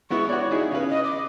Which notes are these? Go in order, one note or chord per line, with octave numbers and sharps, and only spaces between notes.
G#3 B3 E4 C#6
F#4 C#5 D5
D#4 E4 G#4
C#3 B4 F5
D#5
D6